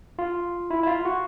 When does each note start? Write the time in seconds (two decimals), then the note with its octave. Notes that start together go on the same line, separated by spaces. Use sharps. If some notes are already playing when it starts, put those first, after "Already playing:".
0.19 F4
0.70 E4
0.83 E4
0.87 F4
1.05 F#4